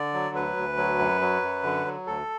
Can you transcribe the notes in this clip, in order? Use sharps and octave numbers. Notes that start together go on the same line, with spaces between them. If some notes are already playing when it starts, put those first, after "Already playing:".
Already playing: D3 D5
F#3
D2 B4
D2
F#3
F#2
F#3
F#2
D3
F#3
D2 A4